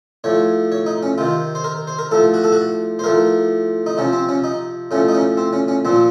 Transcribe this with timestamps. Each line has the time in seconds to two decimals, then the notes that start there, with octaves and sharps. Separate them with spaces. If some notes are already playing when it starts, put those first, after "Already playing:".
0.24 A2 F3 C#5
0.72 C#5
0.86 D#4
1.03 C#4
1.18 C3 D#3 F4
1.55 C5
1.64 A#4
1.87 C5
1.99 A#4
2.11 A2 F3 A4
2.34 F#4
2.44 A4
2.52 F#4
2.99 C5
3.04 A2 F3 A#4
3.86 D#4
3.97 C3 F3 C#4
4.13 C4
4.29 C#4
4.44 D#4
4.91 A2 F3 C#4
5.08 D#4
5.14 C#4
5.37 C4
5.53 C#4
5.68 C#4
5.85 A#2 F3 C4